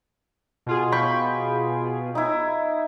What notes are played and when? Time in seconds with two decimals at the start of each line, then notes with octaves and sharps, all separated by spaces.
0.66 B2 F4 G#4
0.92 G5 B5 C#6
2.15 D#4 E4